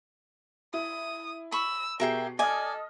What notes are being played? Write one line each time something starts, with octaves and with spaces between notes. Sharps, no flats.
E4 D#6
B5 C#6 E6
B2 G4 G#4 A#4 E5 G5 C7
A4 D5 D#5 G#5 D#6 F6